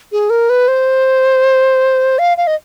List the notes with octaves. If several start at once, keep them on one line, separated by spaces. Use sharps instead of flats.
G#4
A#4
B4
C5
F5
F5
D#5